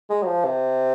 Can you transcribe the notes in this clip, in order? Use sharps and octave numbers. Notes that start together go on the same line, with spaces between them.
G#3
F#3
F3
C3